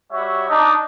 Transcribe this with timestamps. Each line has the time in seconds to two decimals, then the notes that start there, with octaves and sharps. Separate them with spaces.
0.12 G3 F#4 C#5 E5
0.49 D4 D#4